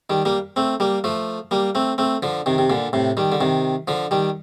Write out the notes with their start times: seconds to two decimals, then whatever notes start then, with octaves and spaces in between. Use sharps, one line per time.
0.10 D#3 G3
0.25 G3 A#3
0.56 A3 C4
0.80 G3 A#3
1.04 F3 A3
1.51 G3 A#3
1.75 A3 C4
1.98 A3 C4
2.23 D3 F3
2.46 C3 D#3
2.58 C3
2.70 A#2 D3
2.93 A2 C3
3.17 D#3 G3
3.32 D3
3.41 C3 D#3
3.88 D3 F3
4.11 D#3 G3